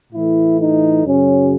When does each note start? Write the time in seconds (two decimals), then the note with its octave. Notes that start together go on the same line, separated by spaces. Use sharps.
0.13 A2 E3 A3 E4
0.59 D#4
1.05 F#2 C#3 F#3 C#4